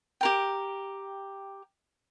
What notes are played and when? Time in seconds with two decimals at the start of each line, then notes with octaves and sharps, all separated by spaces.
0.21 G4 A#4 G5